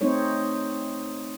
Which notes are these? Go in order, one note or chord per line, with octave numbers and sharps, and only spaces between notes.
A3 C4 D#4 C5 C#5